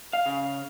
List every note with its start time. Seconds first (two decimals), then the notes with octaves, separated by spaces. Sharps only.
0.13 F5
0.26 C#3